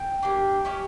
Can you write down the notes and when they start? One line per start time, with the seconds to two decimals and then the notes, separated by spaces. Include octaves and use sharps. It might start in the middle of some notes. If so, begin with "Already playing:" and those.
Already playing: G5
0.23 A#3 D4 G4
0.65 C#4 E4 G4